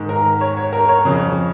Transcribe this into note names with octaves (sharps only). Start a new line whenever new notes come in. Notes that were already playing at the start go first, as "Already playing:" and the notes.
Already playing: G#2 D#3
A#4
C#5
C#5
A#4
C#5
F2 C#3